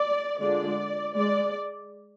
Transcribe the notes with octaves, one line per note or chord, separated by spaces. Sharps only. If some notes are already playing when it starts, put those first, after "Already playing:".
Already playing: D5
D3 G#3 D4 F4 D5
G#3 D5